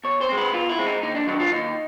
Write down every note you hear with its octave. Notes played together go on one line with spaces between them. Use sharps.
B2 C#5
C5
G#3 C4
B4
B2 F4
E4
G#3 C4
D#4
D#2 D#4
D4
D#3 F#3 B3 D4 D#4
F4
D#2 D#4